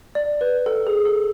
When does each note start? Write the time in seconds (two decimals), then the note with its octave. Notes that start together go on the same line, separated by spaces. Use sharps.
0.15 D5
0.41 B4
0.66 A4
0.87 G#4
1.05 A4